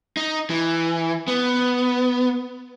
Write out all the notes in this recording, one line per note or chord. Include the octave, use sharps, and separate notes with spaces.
D#4
E3
B3